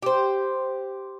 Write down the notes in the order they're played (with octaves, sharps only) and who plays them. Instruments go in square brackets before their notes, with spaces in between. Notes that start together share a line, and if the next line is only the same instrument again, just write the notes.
[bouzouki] G4 C5